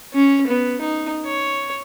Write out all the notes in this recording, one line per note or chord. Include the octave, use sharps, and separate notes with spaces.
C#4
B3
D#4
C#5